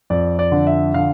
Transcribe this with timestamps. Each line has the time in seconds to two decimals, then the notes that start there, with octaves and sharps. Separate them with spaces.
0.10 F2 D5
0.39 D5
0.52 D3
0.67 E5
0.94 D3 F5